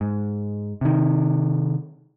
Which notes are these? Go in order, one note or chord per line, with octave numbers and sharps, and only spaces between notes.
G#2
C3 D#3